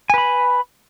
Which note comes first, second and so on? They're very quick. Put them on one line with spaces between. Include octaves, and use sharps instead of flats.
G#5 B4 B5